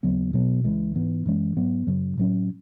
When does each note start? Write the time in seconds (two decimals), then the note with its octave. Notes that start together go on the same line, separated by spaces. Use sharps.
0.03 D#2 C#3 F#3 B3
0.33 B2 F#3 B3
0.64 C#2 C#3 E3 G#3
0.95 G#2 E3 B3
1.26 F#2 E3 G#3 C#4
1.56 G#2 F#3 B3
1.87 F#2 C#3 F#3
2.17 A2 F#3 C#4